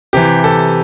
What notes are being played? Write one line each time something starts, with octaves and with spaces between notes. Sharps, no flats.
C3 E3 G4
A4